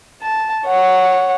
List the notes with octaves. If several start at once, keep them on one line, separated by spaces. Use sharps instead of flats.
A5
C#5 F#5